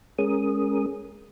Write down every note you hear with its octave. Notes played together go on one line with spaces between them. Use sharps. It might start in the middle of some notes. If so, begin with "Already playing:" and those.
G#3 C#4 G#4 A#4 D#6